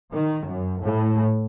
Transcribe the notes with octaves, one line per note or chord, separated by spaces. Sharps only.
D#3
F#2
A2